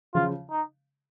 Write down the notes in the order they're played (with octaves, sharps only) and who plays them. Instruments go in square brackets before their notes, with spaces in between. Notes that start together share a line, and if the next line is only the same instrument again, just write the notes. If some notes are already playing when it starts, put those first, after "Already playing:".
[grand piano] C#3 F3 [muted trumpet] F4
[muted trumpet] D#4